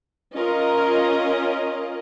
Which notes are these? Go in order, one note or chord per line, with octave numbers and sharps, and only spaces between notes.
C#4 F4 A#4 D#5